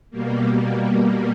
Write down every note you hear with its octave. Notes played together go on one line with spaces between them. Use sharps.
B2 G3 A#3